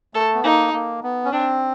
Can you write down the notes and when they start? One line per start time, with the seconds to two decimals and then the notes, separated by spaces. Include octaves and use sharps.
0.14 A3 A4
0.34 B3
0.44 A#3 D#4
0.73 A#3
1.03 B3
1.25 C#4
1.32 C4 D4